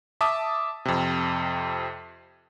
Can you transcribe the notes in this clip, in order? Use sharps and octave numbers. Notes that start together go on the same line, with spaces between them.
E5 A5 D6 D#6
F2 C3